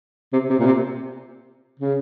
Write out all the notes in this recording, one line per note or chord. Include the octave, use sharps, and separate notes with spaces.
C3
C3
A#2
C3
C#3